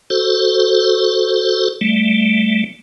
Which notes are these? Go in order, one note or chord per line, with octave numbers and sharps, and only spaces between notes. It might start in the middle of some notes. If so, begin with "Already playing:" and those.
F#4 A4 C5
G3 A3